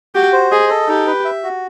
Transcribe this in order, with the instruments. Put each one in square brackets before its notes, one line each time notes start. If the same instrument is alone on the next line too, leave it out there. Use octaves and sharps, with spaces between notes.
[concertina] F#4 [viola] G4
[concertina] C5
[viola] G#4 [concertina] D#5
[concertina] A4
[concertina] D#4 [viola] G4
[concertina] B4
E5
F#4